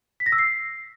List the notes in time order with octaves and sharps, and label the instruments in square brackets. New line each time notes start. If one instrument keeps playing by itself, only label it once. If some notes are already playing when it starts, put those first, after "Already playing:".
[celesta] B6
A#6
E6
C7